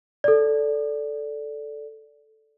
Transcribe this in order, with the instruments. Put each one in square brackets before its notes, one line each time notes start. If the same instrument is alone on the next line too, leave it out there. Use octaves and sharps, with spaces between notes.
[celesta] A4 D5